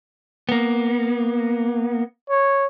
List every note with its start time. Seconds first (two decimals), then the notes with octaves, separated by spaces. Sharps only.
0.49 A#3 B3
2.30 C#5